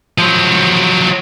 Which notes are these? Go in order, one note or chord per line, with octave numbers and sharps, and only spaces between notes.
F3 F#3